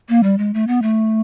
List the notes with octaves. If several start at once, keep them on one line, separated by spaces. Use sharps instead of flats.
A#3
G3
G#3
A3
B3
A3